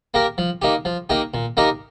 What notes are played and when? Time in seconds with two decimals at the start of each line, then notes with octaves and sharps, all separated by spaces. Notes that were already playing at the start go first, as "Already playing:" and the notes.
0.14 A#3 G4 A#4
0.38 F3
0.62 A#3 D#4 G4
0.85 F3
1.09 A#3 D#4 G4
1.34 A#2
1.57 A#3 D#4 G4 A#4